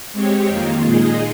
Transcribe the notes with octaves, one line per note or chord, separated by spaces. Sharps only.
G#3 C4 G4 C#5
F2 D#3 A#3 F4
A#2 G#3 D#4 G#4 D#5